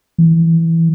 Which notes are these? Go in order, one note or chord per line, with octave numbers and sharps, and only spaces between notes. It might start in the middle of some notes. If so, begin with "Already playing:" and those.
E3